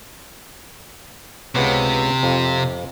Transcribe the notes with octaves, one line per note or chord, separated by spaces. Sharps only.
C#2 C3 B3 C#5
F2 F4